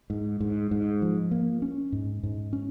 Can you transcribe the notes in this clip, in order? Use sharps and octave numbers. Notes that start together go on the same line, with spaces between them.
G#2
G#2
G#2
F3
A#3
C#4
G#2
G#2
C#4